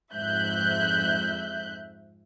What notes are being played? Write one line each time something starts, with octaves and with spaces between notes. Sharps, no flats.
F2 G#2 E5 F#6 G6